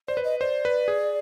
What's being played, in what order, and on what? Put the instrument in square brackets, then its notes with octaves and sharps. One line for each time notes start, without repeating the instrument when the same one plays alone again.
[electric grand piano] C5 [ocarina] D5
[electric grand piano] B4
[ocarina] D#5
[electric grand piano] C5 [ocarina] D5
[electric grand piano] B4
G#4